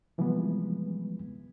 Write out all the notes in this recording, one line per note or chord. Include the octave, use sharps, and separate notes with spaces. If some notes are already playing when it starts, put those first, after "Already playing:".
C3 E3 F3 G3 G#3 B3